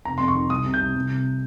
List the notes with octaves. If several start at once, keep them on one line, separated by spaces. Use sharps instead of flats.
F1 A#5
F2 C6
C#6
D#3
C2 D#6
C3
G6
C2
C2
C3